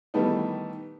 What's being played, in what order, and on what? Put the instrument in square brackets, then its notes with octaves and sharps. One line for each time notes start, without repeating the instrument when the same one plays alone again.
[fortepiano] D#3 E3 G3 A3 B3 D#4